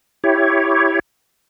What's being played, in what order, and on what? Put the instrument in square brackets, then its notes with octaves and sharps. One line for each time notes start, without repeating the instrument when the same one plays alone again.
[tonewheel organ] E4 G4 C#5